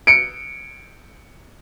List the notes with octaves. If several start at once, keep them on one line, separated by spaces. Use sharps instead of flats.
C#7 D7